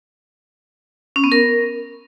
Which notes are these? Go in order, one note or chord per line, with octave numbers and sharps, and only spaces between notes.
C#4
B3
A#4